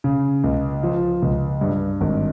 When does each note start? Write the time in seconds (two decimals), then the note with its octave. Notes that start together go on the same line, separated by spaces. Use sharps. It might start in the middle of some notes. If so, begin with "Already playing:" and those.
0.04 C#3
0.44 C#2
0.83 F3
1.22 C#2
1.61 G2
2.01 G#1